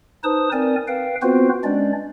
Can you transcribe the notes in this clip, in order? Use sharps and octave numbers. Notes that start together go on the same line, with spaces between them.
D#4 B4 C5 A5 D#6
C4 A#4 D5 G#5
B4 F5 G5
B3 C4 F4 F#4 B4 C5
G#3 C#4 D4 D5